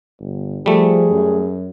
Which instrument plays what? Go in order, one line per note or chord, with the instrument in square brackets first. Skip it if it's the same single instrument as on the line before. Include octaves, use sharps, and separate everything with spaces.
[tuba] G1
[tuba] F3 [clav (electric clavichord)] G3 A3 [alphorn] G#4
[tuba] F#2